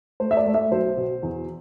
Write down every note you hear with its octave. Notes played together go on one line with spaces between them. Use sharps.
A3 C5
E5
D5
A3
E5
B1 C5
B2
E2